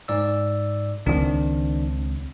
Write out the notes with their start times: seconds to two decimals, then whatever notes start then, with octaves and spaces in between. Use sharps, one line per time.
0.08 G#2 D5 E6
1.06 C#2 D#3 F3 C4 D4